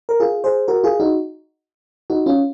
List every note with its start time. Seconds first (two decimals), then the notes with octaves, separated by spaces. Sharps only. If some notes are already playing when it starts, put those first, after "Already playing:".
0.09 A#4
0.20 F4 G#4
0.44 G#4 C5
0.68 F#4 A#4
0.84 F4 G#4
1.00 D#4 F#4
2.10 D#4 F#4
2.26 C#4 F4